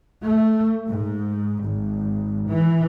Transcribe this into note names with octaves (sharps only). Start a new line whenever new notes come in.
A3
G#2
G#1
E3